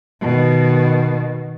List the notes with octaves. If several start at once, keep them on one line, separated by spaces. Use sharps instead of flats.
B2 D#3